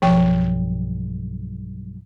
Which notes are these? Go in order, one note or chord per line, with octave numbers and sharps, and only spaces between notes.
B1 G2 F3 G5